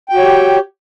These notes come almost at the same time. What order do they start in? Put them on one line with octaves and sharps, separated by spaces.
G5 F#4 C#5 G4